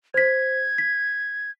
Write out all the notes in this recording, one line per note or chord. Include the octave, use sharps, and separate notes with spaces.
C5 G#6 B6
B6